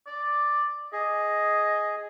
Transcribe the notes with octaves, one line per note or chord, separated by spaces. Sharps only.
D5
G#4 D#5